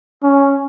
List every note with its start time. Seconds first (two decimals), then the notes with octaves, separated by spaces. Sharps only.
0.23 C#4